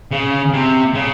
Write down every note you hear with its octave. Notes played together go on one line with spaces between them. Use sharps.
C#3
C3
C#3